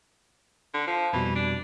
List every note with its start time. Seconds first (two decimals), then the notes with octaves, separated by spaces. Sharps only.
0.74 D3
0.87 F3
1.13 F2 B2 E3 G3
1.35 D4